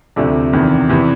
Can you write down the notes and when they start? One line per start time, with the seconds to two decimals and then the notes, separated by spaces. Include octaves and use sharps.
0.16 D2 C3 F3 A3 D4
0.53 E2 C3 D#3
0.89 E2 C3 E3